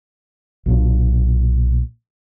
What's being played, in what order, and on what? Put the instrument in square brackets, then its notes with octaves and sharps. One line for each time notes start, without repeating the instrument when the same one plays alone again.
[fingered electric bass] B1 A#2 D4